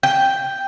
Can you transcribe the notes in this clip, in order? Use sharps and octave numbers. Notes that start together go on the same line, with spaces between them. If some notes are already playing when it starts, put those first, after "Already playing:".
G5